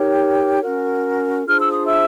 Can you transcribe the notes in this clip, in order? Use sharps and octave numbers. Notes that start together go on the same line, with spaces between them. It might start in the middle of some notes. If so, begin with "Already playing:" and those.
Already playing: D#4 G4 A#4 C#5
C#4 F#4 A#4
D4 F4 G#4 C5 F6
E6
D#6
E5 E6